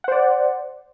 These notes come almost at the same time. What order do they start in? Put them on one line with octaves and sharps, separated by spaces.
F#5 C5 D5